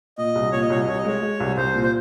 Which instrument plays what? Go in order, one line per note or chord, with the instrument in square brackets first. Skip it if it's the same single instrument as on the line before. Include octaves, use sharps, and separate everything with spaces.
[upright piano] A#2 [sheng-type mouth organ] D#5
[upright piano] C2
[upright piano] A#2 [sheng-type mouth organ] C#5
[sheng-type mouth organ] D#5
[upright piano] C2 [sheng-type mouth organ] C#5
[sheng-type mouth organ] D#5
[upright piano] C2 [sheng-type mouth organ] C#5
[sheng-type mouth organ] D#5
[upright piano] G#3 [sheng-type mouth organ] C#5
[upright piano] G#3
C2
[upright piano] C2 [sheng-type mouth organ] C5
[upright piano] A#2
[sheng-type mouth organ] C5